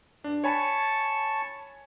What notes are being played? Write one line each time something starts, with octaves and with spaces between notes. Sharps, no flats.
G2 D4
C#5 G#5 A5 B5 C#6